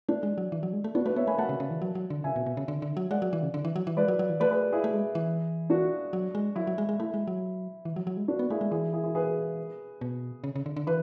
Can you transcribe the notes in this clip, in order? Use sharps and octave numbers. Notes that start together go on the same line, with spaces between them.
A3 D4
G#3
F#3
E3
F#3
G#3
A3
B3 D4 F#4
A3 B4 D5
B3 C#5 E5
A3 G#5 B5
A3 F#5 A5
C#3
C#3
E3
F#3
F#3
D3
C#3 E5 G#5
B2
B2
C#3
D3
D3
F#3
G#3 D5 F#5
F#3
E3
C#3
D3
E3
F#3
E3
G#3 B4 D5
F#3
F#3
E3
A3 B4 D5
G#4 B4
E4 G#4
A3
G#3
E3
D4 F#4
F#3
G#3
F#3 E4
F#3
G#3
G#3
A3 E4
G#3
F#3
E3
F#3
F#3
G#3
D4 F#4
B3
A3 E4 G#4
G#3
E3 E4 G#4
E4 G#4
E4 G#4
G#4 B4
B2
C#3
C#3
D3
D3
E3 B4